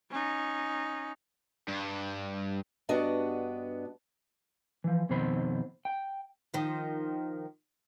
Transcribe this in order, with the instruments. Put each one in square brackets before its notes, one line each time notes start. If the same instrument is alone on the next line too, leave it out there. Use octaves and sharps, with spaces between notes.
[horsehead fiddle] C#4 D#4
[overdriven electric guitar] G2
[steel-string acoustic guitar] G2 B3 D4 F#4 D#5
[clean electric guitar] E3 F3
F2 B2 D#3 C4 C5 B5
G5
[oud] D#3 F3